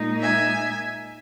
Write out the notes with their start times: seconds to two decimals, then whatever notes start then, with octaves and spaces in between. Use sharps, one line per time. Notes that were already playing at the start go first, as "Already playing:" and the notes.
Already playing: A#2 G#3 D#4
0.21 E5 G#5